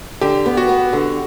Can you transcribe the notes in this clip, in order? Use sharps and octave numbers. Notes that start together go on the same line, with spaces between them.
D3 G4
B3
F#4
B3
D3